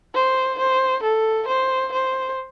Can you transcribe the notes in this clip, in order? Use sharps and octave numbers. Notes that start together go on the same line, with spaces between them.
C5
C5
A4
C5
C5